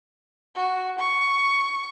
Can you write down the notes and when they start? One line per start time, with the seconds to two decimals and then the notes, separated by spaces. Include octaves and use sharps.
0.56 F#4
0.99 C#6